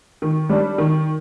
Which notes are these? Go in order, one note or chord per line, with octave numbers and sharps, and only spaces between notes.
D#3
G3 D4
D#3